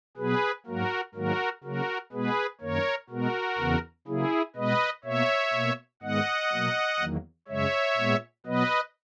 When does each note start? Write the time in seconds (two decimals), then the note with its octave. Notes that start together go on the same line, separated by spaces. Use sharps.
0.17 B2 F#3 B3 G#4 B4
0.66 G#2 F#3 A#3 F#4 A#4
1.15 G#2 D#3 F#3 A#3 F#4 A#4
1.64 C#3 F#3 A#3 F#4 A#4
2.12 B2 G#3 B3 G#4 B4
2.61 F#2 D#3 A#3 A#4 C#5
3.09 B2 G#3 B3 F#4 A#4
3.58 E2 C#3 E3 B3
4.07 C#3 F#3 A#3 E4 G#4
4.56 B2 G#3 B3 B4 D#5
5.05 B2 A#3 C#5 E5
5.53 B2 A#3
6.02 G#2 D#3 G#3 B3 D#5 F#5
6.52 B2 F#3 A#3
7.00 E2 D#3 F#3 A#3
7.48 F#2 C#3 G#3 C#5 E5
7.97 A#2 G#3 B3
8.46 B2 F#3 B3 B4 D#5